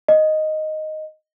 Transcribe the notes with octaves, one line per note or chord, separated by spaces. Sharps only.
D#5